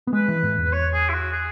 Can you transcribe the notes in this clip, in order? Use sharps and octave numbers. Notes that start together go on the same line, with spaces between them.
B3
G#3 B4
E3
G#2
E2
B4
C#5
G#4
E4
F#4
G#4